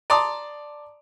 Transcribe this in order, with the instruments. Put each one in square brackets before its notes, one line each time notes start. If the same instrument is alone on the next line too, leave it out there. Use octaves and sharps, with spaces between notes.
[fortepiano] D5 A5 A#5 C6 D6 D#6